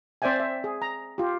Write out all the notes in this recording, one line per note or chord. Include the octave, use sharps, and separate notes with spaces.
C4 C5 D5 E5 G5 G#5
E5
G#4
A#5
F4 G4